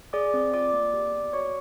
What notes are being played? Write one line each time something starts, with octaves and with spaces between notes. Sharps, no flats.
G#4 D5 D6
C4
F4 D5 D6
A#3
G4
B3
F#4 C#5 C#6